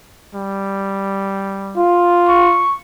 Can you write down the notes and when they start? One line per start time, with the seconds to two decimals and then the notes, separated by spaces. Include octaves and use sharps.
0.34 G3
1.77 F4
2.29 C#6